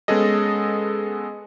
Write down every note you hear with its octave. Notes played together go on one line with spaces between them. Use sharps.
G#3 B3 C#4 G#4 A4 D#5